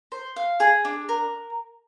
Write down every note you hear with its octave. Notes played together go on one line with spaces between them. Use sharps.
C5
F5
G#4
D4
A#4